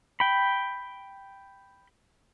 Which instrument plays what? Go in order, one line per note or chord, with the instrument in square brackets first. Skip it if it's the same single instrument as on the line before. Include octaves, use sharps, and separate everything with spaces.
[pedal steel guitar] G5 B5